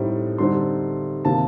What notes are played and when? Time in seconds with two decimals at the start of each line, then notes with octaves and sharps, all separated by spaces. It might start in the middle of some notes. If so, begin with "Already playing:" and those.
Already playing: A2 G3 C4 D#4
0.38 D3 G3 C4 D#4 C6
1.25 C3 D#3 A#3 A5